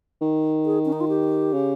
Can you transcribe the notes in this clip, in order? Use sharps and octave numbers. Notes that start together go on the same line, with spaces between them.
D#3
G#4
C#4
D#4
F4
G4
C#3